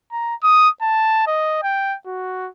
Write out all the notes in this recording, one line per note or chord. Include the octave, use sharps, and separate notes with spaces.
A#5
D#6
A5
D#5
G5
F#4